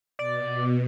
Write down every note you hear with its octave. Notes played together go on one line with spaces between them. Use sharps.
B2 D5